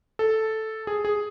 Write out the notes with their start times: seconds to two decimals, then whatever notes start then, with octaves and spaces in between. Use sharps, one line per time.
0.19 A4
0.87 G#4
1.05 G#4